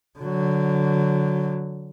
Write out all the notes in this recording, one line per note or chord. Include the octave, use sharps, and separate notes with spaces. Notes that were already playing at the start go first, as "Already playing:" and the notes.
D3 F#3